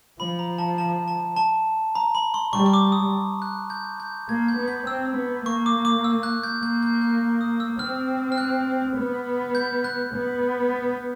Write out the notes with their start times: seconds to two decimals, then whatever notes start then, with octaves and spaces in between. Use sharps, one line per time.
0.20 F3 B5
0.39 A#5
0.58 A5
0.78 A5
1.08 A5
1.36 A5
1.95 A#5
2.15 B5
2.34 C6
2.53 G3 C#6
2.66 C#6
2.73 D6
2.92 D#6
3.42 F#6
3.70 G6
4.00 G6
4.29 A#3 G#6
4.48 G6
4.58 B3
4.68 G6
4.87 C4 E6
5.16 B3
5.46 A#3 C#6
5.66 D6
5.85 D6
6.04 E6
6.23 F#6
6.43 G6
6.63 A#3 G6
6.83 G6
7.02 F#6
7.41 D#6
7.60 E6
7.79 C4 F6
8.32 F6
8.38 F#6
8.97 B3
9.55 G6
9.84 F#6
10.14 B3